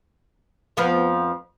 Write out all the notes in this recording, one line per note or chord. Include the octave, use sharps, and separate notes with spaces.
F2 F3 B3